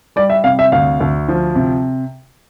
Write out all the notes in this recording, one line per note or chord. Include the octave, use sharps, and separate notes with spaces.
G3 D5
E5
C3 F5
E5
D2 F5
D2
F3
C3